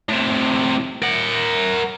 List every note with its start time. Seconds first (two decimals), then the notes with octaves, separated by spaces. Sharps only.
0.09 A2 C3
1.02 A#4 F#5